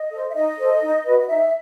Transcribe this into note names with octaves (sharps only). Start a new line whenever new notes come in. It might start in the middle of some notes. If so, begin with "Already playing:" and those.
Already playing: D#5
A4 C5
E5
D#4 D#5
A4 C5
D#4
F#4 B4
D#5
D#4 E5